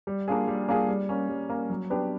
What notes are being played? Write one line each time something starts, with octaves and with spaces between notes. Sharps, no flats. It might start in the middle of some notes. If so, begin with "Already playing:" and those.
G3
A#3 D4 F4 G#4
G3
A#3 D4 F4 G#4
G3
A#3 C#4
G3
A#3 C#4
F#3
B3 D4 G4 B4